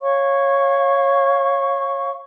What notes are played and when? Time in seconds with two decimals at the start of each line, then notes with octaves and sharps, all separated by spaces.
0.01 C#5 F5 C#6